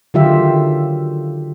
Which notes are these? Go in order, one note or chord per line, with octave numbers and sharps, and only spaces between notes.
D3 D#3 F#3 F4 G4 E5